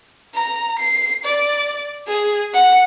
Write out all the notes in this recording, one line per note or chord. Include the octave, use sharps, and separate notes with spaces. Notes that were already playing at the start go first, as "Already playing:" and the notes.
A#5
C7
D5
G#4
F#5